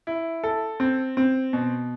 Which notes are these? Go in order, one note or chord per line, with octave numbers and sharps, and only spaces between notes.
E4
A4
C4
C4
B2